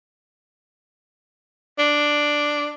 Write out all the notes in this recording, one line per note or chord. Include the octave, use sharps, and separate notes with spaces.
D4